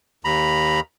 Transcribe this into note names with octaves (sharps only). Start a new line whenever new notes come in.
D#2 A#5 B5